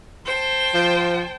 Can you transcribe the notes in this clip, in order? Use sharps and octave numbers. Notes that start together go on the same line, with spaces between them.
C5 G5 A5
F3